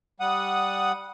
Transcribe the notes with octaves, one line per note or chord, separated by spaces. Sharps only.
G3 F#5 D#6